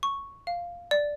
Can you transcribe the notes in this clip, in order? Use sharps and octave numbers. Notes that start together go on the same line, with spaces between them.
C#6
F5
D5